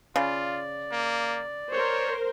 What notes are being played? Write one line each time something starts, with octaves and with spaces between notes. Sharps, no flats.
C#3 F4 D5
A#3
A#4 C5 C#5